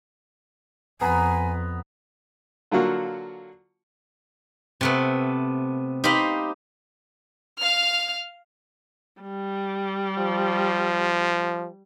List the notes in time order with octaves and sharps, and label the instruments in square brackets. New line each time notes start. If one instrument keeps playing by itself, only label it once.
[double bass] F2 [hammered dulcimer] B3 A#5 B5 [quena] G#5
[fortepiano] D3 F#3 A#3 F4 F#4
[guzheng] C3 A3 B3
D#4 G4 C5 F5 B5
[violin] F5 F6
[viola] G3
[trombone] F3